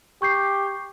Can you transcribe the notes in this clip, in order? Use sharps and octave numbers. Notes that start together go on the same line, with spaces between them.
G4 C#6 G6 C7